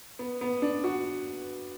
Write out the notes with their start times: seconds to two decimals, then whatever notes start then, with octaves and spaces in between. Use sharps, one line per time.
0.19 B3
0.41 B3
0.62 D4
0.84 F#4